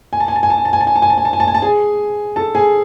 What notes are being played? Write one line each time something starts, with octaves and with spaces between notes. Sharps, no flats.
G#5
A5
G#5
A5
G#5
A5
G#5
A5
G#5
A5
G#5
A5
G#5
A5
G#5
A5
G#5
A5
G#5
A5
G#4 G#5
A4 A5
G#4 G#5